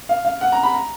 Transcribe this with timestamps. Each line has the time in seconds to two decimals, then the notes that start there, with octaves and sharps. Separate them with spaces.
0.09 F5
0.25 F5
0.41 F#5
0.52 A#5
0.63 B5
0.74 A#5